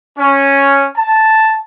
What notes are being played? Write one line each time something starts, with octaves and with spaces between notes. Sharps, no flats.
C#4
A5